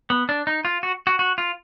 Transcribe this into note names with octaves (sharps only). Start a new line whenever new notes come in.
B3
D4
D#4
F4
F#4
F#4
F#4
F4